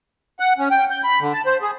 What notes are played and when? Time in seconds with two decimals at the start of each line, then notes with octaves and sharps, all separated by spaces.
0.40 F#5
0.58 C#4
0.71 G5
0.91 G6
1.04 B5
1.20 D3
1.33 A5
1.46 C5
1.62 G#4